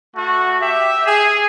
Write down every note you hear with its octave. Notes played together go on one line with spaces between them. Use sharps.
A3 F#4
G4 E5
G#4